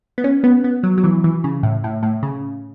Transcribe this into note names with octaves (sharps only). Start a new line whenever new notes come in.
B3
C#4
B3
B3
F#3
F#3
E3
E3
C#3
A2
A2
A2
C#3